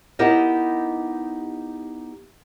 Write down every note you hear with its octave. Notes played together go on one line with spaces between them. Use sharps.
B3 D#4 E4 G4 A#4 D#5